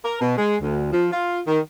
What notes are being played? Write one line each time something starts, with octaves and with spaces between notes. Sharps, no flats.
A#4
B2
G#3
D2
F3
F4
D#3